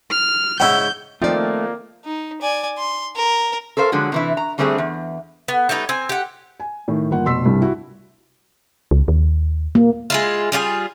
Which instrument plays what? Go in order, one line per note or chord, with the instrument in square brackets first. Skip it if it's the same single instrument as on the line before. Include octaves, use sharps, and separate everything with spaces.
[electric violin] F6
[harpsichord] G#2 C#3 E4 [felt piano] F#5 E6 [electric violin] G6
[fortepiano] D#3 F3 C4 [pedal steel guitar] A3 [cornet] A#3 [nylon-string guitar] F4 D5
[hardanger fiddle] D#4
D5 G#5
C6
A#4
[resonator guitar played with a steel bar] A4 A#4 C5 F5
D3 F3 F#3 G#3
C3 E3 E4
A#5
D3 G3 A3 C4 G4 G#4
E2
[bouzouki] B3
G3 A3 B3 D#4
C4 G#5
G4 F#5
[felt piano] G#5
A2 D#3
G1 A#3 F4 F#5
F1 B2 C6 E6 B6
C2 G2 C3
E4 F#4
[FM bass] C#2
D#2
[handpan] A#3
[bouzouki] G#3 E4 F4
G3 F4 F#4 G#4